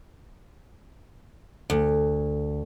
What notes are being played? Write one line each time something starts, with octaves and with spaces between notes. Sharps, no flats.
D2